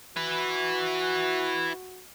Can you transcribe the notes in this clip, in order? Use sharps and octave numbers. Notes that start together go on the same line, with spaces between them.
E4 F#4 B4